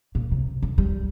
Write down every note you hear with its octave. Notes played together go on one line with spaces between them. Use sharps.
A#2
C3
D#3
G3